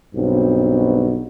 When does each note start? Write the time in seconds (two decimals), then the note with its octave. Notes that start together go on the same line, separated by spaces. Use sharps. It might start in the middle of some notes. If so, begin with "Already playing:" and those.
0.15 B1 G2 B2 C4